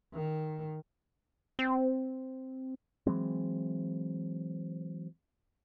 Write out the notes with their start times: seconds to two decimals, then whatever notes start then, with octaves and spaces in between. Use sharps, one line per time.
0.14 D#3
1.59 C4
3.07 E3 F#3 G#3 C4